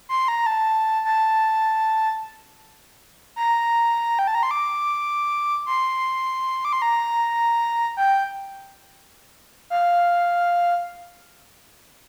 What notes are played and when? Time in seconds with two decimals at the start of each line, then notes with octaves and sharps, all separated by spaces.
0.09 C6
0.28 A#5
0.46 A5
1.05 A5
3.36 A#5
4.19 G5
4.27 A5
4.35 A#5
4.43 C6
4.51 D6
5.66 C6
6.65 D6
6.73 C6
6.82 A#5
7.97 G5
9.70 F5